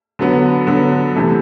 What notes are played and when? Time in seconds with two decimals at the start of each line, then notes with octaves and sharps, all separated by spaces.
0.19 D3 F#3 B3
0.67 D3 F#3 B3
1.16 C3 E3 A3